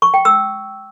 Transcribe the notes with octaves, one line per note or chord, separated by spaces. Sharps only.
C#6
G5
E6